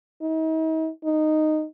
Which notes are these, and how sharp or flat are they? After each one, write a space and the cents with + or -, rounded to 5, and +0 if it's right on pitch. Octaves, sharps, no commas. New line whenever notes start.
D#4 +40
D#4 -10